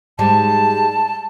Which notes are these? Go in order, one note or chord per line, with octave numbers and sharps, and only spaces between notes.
G#2 G3 G#3 A5